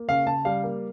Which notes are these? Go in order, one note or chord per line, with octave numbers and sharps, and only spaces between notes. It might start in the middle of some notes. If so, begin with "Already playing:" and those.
Already playing: A#3
C#3 F5
C#3 A5
G3 F5
A#3